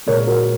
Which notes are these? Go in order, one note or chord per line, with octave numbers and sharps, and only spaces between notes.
A#2 G#3 A#4 C#5
F#4 A#4